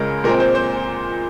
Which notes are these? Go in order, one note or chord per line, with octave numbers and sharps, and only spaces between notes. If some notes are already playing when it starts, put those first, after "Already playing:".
Already playing: C#2 C#3 G#3 A#4
A#2 G#3 C4 A#4
C5
C5